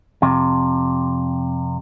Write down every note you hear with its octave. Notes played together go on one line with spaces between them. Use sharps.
F2 C3